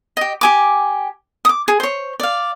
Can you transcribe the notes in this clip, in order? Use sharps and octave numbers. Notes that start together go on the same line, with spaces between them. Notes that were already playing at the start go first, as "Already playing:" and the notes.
G4 D#5
G4 G#5 D6
D6 D#6
G#4
C5 C#5
D5 F5